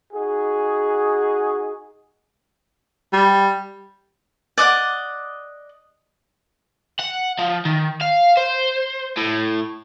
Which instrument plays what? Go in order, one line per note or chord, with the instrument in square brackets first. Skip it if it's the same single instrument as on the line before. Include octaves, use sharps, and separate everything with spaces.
[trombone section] D#4 F#4 G#4
[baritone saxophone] G3
[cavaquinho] D5 D#5 F#5 D6
[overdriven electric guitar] F#5
F3
D#3
F5
C5
A2